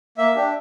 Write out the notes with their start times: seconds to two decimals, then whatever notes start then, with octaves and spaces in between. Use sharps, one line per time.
0.18 A#3 E5
0.35 D4 G4